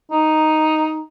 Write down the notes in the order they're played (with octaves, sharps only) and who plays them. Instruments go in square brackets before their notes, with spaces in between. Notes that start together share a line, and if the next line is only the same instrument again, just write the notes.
[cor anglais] D#4